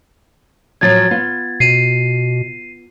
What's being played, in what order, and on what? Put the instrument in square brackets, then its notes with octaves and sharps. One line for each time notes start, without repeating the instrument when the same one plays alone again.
[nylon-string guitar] A2 F3 F#3 [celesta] G#6 A6
[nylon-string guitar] B3 F4
[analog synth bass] B2 [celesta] C7 D#7